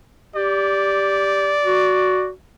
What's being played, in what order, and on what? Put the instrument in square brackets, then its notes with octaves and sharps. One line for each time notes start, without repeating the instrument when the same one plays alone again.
[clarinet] G4 [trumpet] D5
[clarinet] F#4